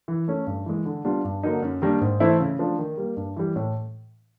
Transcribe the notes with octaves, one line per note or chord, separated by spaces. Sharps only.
E3
A3 C#4
G2
E3 G#3
D3
G3 B3 D4 F4
G2
D3 F#3 A#3 D#4
F#2
D#3 G3 A#3 D4
G#2
E3 A3 C4 E4
C#3
F3 A3 D4 F4
D#3
G3 A#3
G2
E3 G3
A2